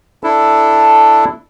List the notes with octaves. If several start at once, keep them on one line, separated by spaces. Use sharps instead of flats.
D4 E4 A4